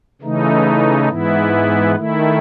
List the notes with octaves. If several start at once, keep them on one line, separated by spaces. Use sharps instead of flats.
C#3 E3 A3 D#4
G#2 E3 B3 E4
D#3 A3 E4